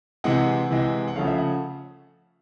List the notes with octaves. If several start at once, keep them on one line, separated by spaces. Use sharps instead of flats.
C3 E3 G#3 C4 F#5
C3 E3 G#3 C4
F#5
C#3 F3 A3 C#4 F5
E5
F#5